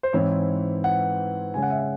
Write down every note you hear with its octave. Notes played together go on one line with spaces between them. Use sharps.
C5
G#2 E3 C4 E4 C#5
F#5
C#3 G#3 C#4 G#5
F#5
E5
F#5